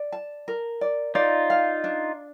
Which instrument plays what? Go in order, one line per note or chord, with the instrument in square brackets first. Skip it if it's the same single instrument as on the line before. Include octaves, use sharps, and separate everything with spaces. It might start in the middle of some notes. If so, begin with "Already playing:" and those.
Already playing: [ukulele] D5
A5
A#4
D5
[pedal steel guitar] D#4 F4 [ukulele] D5
[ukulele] F5
D4